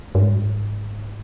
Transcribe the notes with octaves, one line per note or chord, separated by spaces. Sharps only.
G2
G#2